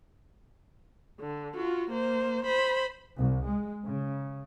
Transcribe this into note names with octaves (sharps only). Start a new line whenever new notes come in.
D3
F4 F#4
A#3 C5
C5 B5
C2
G#3
C#3